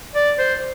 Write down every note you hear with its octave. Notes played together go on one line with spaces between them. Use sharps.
D5
C5